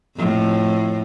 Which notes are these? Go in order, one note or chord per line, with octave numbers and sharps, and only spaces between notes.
F2 A2